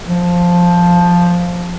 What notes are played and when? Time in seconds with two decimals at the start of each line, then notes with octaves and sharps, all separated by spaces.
0.07 F3